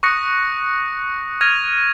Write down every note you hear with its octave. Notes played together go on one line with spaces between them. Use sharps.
C#6 D#6 F#6 A#6 C#7
F6 G#6 A#6 D#7 F7